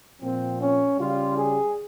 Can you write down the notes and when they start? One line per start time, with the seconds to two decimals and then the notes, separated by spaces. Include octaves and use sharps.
0.21 A#2 F3 C4
0.60 C#4
0.98 C#3 G3 F4
1.37 G#4